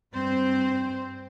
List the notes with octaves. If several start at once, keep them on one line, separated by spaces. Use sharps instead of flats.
G2 C4 C5